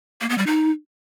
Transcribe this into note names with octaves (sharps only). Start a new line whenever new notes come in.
A#3
B3
G3
D#4